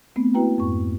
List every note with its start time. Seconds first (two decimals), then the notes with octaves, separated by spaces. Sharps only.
0.16 A3 B3 C4
0.34 A#3 E4 F#4 B4 G5 A#5
0.58 F2 G#2 C#6